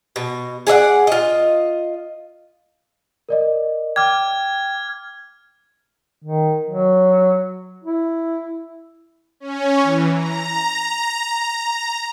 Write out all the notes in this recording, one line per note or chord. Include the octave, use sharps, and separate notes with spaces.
B2
G#4 D5 E5 F#5
F4 D#5
A#4 D5 D#5
G5 D6 F6 G#6
D#3
F#3
E4
C#4
E3
A#5